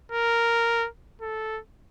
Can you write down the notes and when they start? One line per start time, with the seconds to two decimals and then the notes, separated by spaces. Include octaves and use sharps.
0.12 A#4
1.21 A4